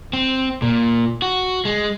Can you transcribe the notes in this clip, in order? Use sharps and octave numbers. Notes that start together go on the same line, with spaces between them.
C4
A#2
F#4
G#3